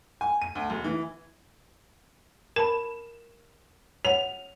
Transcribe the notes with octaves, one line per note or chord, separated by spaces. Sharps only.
G#5
D#7
D2
E1
E3
A#4 A5 B5 E7
C#5 F#5 F7